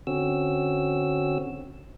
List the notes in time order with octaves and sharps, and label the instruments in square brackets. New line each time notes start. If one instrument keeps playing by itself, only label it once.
[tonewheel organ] D3 C4 C#4 F#4 E6